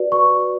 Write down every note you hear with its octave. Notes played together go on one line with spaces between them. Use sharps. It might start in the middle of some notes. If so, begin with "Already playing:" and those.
Already playing: F#4 B4 D5
C#6